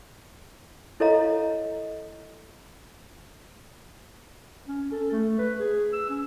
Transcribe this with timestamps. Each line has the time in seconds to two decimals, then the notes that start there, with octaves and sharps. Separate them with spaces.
1.00 E4 A4 C#5 D#5 F5 A#5
4.68 C#4
4.92 A4
5.12 A3
5.38 B4
5.60 G#4
5.93 E6
6.09 C#4